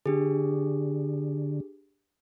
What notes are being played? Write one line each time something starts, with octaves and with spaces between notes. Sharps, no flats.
D3 D4 G4 G#4